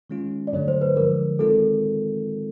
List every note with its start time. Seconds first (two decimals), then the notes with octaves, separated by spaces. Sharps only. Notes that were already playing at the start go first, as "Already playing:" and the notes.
0.10 D#3 G#3 C#4 F4
0.47 D5
0.53 G2 D3 F#3 A3 C#5
0.68 C5
0.81 B4
0.96 D3 F3 G#3 A#4
1.39 D#3 G#3 C4 F4 A4